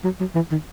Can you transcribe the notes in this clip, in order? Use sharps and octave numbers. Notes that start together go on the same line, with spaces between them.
F#3
F#3
E3
D#3